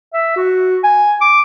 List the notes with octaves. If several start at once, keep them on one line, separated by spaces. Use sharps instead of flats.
E5
F#4
G#5
D6